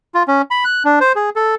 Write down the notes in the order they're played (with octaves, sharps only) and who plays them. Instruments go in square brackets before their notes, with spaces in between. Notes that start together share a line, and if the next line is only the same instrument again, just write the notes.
[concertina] F4
C#4
B5
F#6
D4
C5
G#4
A4